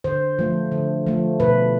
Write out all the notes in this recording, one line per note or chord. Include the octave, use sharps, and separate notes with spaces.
D3 C5
F3 A3
D3
F3 A3
B2 B4